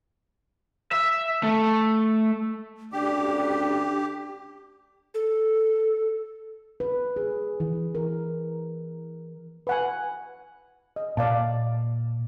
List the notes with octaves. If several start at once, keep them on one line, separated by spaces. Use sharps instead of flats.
E5
A3
D2 C#3 D4 G4 D5
A4
B4
G#4
E3
A#4
B4 F#5 G#5
D#5
A#2 D5 F5 A5